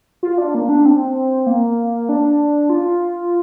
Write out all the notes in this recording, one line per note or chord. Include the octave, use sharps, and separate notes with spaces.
F4
D4
A#3
D4
C4
A#3
D4
F4